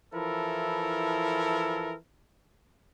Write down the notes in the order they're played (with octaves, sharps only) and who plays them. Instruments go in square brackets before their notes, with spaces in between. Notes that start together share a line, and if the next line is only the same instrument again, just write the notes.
[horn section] E3 F3 E4 A4 A#4